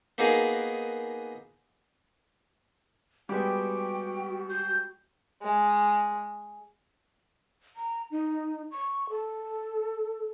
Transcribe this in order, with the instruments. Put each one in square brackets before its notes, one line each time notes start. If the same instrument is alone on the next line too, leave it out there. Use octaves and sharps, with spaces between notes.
[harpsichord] A#3 B3 D#4 F#4 G#4 A#4
[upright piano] G3 G#3 B3 [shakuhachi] F#4 [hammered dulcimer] G4 [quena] G5
[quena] G6
[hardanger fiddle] G#3
[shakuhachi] A#5
D#4
C#6
A4